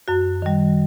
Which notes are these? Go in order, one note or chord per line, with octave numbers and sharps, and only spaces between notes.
F#2 F#4
D#3 G3